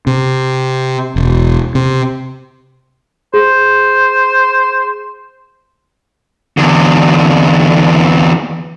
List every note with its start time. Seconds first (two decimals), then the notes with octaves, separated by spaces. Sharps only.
0.07 C3
1.16 E1
1.75 C3
3.34 G#4 C5
6.57 E2 D3